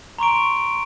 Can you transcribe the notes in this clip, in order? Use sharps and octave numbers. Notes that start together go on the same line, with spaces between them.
A#5 C6 C#6 D7